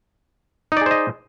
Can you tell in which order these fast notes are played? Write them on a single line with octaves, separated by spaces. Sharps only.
D#4 D5 G#4 C5 D#5